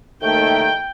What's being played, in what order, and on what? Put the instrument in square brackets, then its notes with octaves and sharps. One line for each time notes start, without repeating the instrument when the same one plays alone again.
[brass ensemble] D#2 D#3 A3 [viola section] G5